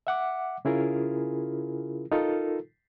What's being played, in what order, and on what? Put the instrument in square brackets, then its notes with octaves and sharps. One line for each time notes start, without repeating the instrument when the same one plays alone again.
[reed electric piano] E5 F#5 D6
C#3 C#4 E4 F4 G#4 A#4
D#4 F4 A4 A#4